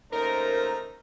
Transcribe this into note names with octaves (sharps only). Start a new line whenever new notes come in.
D#2 A3 C#4 D#4 A#4 C5 A#5